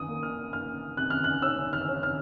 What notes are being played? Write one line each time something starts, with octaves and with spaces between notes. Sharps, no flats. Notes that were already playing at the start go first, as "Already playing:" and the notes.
Already playing: D#6
A#3
F6
A#3 F6
C3 F#6
F6
F#6
C#4 E6
F6
C#4
F6